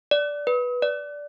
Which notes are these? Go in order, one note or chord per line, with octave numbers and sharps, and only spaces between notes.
D5
B4
D5